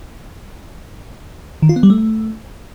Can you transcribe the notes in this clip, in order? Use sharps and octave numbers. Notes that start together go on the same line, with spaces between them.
D#3
F4
B3
G3
A3